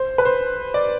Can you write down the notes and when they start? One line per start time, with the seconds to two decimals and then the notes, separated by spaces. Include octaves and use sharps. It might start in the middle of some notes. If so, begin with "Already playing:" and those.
Already playing: C5
0.18 B4
0.25 C5
0.74 D5